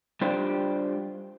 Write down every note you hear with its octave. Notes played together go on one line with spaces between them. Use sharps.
G3 D4 F4 G4 C5